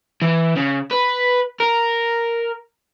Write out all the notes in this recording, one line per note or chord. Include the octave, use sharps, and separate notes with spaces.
E3
C#3
B4
A#4